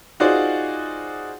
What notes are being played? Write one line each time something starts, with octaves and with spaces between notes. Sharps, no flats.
D#4 F4 F#4 G#4 C5 D5